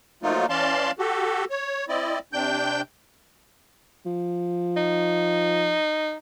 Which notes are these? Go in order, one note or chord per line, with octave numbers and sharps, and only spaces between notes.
F3 F#3 A3 A#3 D#4 F4
E3 C#4 D5 F5 A5 C6
F#4 G4 A4
C#5
C4 E4 D5 D#5
C3 D4 G5 G6
F3
D#4